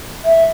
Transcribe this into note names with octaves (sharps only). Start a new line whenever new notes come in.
E5